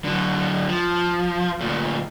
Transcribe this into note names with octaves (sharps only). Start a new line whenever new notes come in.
D3 F#3
F3
D2 A#2